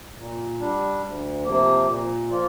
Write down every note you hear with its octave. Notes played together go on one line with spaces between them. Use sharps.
A#2
G3 D4
D2
C3 F3 A#3
A#2
F3 A#3 F4